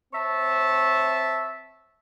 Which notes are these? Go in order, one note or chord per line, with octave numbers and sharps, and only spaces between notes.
C4 C#5 E5 A5